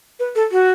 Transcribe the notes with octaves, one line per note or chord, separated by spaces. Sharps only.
B4
A4
F#4